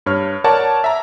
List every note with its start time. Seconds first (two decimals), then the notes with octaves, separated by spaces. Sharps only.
0.06 G2 C#5 F6
0.44 A#4 C#5 D5 F#5 A5
0.84 E5 A#5